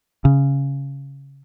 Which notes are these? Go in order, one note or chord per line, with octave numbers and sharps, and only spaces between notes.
C#3